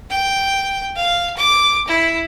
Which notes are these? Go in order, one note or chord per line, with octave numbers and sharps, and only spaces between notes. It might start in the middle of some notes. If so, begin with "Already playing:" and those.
G5
F5
D6
E4